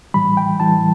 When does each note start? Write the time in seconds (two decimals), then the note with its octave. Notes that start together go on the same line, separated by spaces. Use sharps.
0.14 A2 E3 G3 B5
0.37 G5
0.60 A2 E3 G3 A5